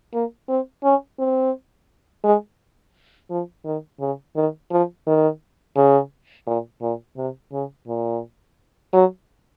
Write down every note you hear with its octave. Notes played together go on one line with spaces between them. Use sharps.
A#3
C4
C#4
C4
G#3
F3
D#3
C#3
D#3
F3
D#3
C#3
A#2
A#2
C3
C#3
A#2
F#3